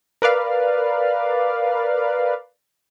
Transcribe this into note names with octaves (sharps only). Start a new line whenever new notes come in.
A#4 B4 D5 F5